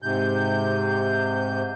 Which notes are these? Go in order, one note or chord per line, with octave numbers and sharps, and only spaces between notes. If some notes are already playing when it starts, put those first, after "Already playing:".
G#2 C3 G6